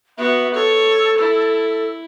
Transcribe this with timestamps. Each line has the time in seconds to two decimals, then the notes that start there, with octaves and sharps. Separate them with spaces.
0.17 B3 F#4 E5
0.54 A4 C#5
1.18 E4